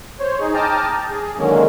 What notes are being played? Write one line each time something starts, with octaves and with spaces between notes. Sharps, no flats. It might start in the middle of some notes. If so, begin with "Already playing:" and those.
C5 C#5
D#4 G#4
G5 A5 A#5 D6 D#6 F6
G#4
D3 D#3 F#3 G#3 A#3 C#4